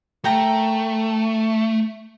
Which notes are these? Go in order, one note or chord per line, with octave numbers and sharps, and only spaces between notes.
A3 A#4 G5 A#5